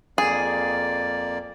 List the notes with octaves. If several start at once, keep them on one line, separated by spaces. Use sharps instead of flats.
F2 A#3 G#4 D5